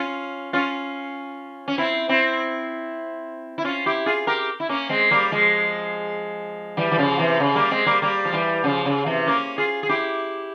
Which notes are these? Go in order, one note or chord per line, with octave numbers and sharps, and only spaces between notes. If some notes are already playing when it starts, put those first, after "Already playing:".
Already playing: C#4 F4
C#4 F4
C#4
C4 E4
C4 E4
E4
C#4 F4
E4 G4
F4 G#4
G4 A#4
E4
A#3 C#4
G#3 C4
G3 A#3
F3 G#3
E3 G3
E3
C#3 F3
C3 E3
C#3
G3 A#3
G#3 C4
G3 A#3
G3 A#3
F3
E3 G3
C#3 F3
C#3
C3 E3
A#3 C#4
F4 G#4
G#4
E4 G4